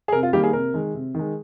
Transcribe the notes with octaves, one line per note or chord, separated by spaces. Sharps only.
G#4
C3 A#4
F4
D#3 G3 A#3 G4
G#4
C3 A#4
D#3 G#3
C3
D#3 G#3